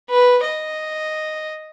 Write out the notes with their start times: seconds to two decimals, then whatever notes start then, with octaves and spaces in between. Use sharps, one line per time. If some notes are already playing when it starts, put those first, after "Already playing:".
0.10 B4
0.44 D#5